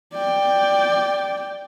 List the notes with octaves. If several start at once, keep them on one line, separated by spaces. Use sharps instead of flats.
D5 G5